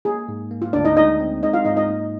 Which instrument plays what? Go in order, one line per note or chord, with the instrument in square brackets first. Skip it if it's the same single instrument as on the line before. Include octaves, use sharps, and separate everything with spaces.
[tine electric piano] A#3 [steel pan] G#4
[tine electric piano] G#2
A#3
[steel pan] F4
[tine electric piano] D2 [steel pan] D4 D5
[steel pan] D#4 D#5
[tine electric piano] G#3 [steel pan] D#4 D#5
[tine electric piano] C4
[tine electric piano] G#3 [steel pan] D#4 D#5
[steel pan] F4 F5
[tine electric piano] G#2 [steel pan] D#4 D#5
[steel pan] D#4 D#5
[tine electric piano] A#3